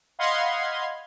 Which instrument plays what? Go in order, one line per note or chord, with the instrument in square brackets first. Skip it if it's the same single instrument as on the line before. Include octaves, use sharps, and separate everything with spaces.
[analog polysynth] D#5 F5 F#5 B5 C6 G#6